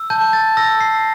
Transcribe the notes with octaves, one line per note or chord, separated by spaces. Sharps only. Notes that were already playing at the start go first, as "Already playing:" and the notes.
Already playing: E6
A5 G6
A6
E6 A#6
C7